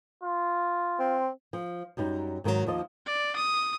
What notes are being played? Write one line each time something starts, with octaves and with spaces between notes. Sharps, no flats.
F4
C4
F3
F#2 F#3 G3 D#4
G#2 D#3 E3 F#3
D#2 F3 F4 D#5
D5
D#6